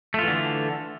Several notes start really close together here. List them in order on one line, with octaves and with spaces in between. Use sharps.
A3 F4 E3 D3